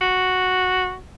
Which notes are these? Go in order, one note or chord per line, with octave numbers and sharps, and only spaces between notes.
F#4